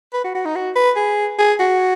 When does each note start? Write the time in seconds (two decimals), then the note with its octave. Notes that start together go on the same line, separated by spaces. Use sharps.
0.14 B4
0.24 F#4
0.35 F#4
0.45 D#4
0.55 F#4
0.75 B4
0.96 G#4
1.38 G#4
1.60 F#4